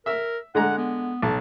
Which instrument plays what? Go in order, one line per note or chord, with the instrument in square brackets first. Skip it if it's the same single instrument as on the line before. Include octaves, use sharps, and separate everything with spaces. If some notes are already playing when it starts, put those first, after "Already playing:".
[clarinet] A#4 [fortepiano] E5 E6
[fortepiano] D3 G#3 A#5 [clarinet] F#5
[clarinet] B3
[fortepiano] B1 [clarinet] A5